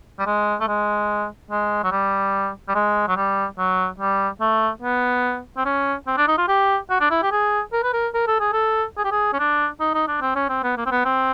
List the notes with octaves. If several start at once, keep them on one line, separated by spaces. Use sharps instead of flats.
G3
G#3
A3
G#3
G#3
F#3
G3
G3
G#3
F#3
G3
F#3
G3
A3
B3
C4
C#4
C4
D4
D#4
F4
G4
F#4
D4
E4
G4
G#4
A#4
B4
A#4
A#4
A4
G#4
A4
G#4
G4
G#4
C#4
D4
D#4
D#4
D4
C4
C#4
C4
B3
A#3
C4
B3
C4